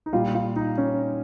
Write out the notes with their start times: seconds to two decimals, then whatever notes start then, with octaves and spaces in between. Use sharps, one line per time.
0.06 D#4
0.13 A#2 G3 F4
0.35 F4
0.56 D#4
0.78 C#4